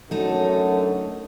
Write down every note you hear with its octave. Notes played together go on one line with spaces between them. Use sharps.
F#2 D3 A3 D#4 A4